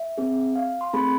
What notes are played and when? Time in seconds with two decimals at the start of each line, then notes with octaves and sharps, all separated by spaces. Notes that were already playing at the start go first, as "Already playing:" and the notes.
Already playing: E5
0.18 C4 G#4
0.56 F5
0.81 C6
0.93 A3 C4 G#4 B5